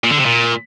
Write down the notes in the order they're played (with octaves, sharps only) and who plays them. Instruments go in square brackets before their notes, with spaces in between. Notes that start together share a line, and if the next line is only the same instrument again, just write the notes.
[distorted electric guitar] A#2
D3
C3
A#2